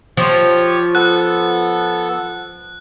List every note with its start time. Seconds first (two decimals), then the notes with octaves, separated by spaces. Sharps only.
0.17 F3 G4 C#5
0.95 B3 A4 F#6